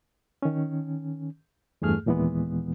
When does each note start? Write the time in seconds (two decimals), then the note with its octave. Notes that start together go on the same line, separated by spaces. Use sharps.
0.42 D#3 C#4
1.82 E2 G2 A3 G#4 F6
2.06 D#2 A#2 E3 G#3 B3